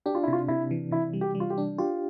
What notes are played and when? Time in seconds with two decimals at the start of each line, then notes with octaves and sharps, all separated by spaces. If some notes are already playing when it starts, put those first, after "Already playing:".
0.06 D4 G4
0.15 F4
0.23 E4
0.28 C3
0.33 F4
0.48 C3 E4
0.71 E3
0.91 C3 E4
1.13 G3
1.21 G4
1.35 G3
1.40 F4
1.50 G4
1.58 D4
1.78 F4 G4